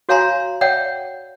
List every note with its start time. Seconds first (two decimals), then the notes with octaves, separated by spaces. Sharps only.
0.09 F#4 C#5 F5 G#5 A#5 C6
0.61 C#5 D5 E5 F#5 G5